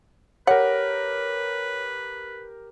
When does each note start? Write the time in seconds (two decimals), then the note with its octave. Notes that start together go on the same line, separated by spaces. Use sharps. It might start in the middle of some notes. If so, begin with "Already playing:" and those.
0.47 G4 A#4 B4 C#5 F#5